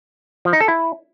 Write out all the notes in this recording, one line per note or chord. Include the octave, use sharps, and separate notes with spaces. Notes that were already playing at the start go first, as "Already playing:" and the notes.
F3
D#4
A4
E4